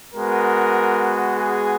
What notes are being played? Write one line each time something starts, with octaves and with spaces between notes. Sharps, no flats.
G#3 B3 F#4 A#4
G#4